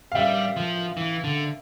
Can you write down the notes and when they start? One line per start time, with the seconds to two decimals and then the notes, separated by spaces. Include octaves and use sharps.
0.12 F5
0.15 G3 E5
0.57 F3
0.97 E3
1.24 D3